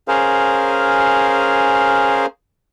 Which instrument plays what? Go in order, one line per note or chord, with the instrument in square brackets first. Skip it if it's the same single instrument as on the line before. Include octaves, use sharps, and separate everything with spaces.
[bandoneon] C#4 G#4 A#4 C5 F5